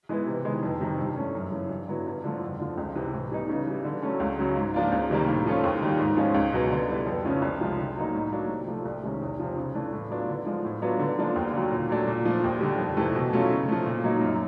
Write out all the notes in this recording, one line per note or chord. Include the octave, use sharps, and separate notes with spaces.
E3 G#3 B3 E4
C3
D#3 G#3 B3
F2
C3 D#3 G3 C4
G2
E3 A3 C#4
F#2
C#3 E3
G2
D3 F#3 B3 E4
G2
D3 F3 A3
F2
D3 F3
C#2
C3 E3
A2
E3 G3 B3 D#4
C#3
E3 G3
D3
F#3 A3 C#4
C#2
C#3 F#3
G#2
F3 A#3 D4 F4
C#2
C3 D#3 G3 A#3
A2
F3 A3 C#4 F4
D#2
D#3 G3
G#2
F3 G#3 C#4 F4
C#2
B2 F#3 B3
D3
G3 B3 E4
F2
C#3 F3 A3 C#4
C2
C3 F3 G#3
D3
F#3 A#3 D#4
A2
F#3 A#3 D4
C3
F3 A3
C2
C3 D#3 G#3 C#4
E2
C3 F3
C#3
E3 A3 D4
A2
F#3 B3 D4 F4
D3
F3 G#3
A2
F#3 B3 D4 F4
D3
F3 A#3 D4 F4
D#2
D3 F#3
A#2
F#3 A3 D4
A#2
F3 A3 D4
D#2
D3 G3
F2
C3 E3 A3
B2
F#3 A3 C#4 F4
C#3
F3 A3
A#2
F#3 A#3 D#4
F#2